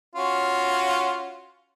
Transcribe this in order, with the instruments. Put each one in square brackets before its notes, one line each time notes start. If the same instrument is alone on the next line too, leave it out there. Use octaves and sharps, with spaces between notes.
[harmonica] C#4 F4 F#4